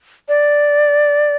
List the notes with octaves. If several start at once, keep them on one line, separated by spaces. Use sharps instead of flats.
D5